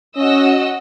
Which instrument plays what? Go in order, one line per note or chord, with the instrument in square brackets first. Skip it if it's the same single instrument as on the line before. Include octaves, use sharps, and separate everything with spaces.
[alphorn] C#4 [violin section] F#4 D#5 E6